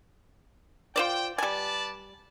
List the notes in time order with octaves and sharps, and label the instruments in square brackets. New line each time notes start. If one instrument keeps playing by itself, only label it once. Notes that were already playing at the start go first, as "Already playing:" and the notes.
[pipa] F4 C5 D5 [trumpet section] G5
[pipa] G3 G#5 [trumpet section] B4 D5 A5